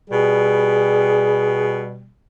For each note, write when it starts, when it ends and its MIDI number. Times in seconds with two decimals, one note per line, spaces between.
0.10 2.11 47
0.10 2.11 55
0.10 1.83 68